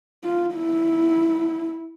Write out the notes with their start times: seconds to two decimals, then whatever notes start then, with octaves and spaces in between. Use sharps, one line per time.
0.24 F4
0.55 E4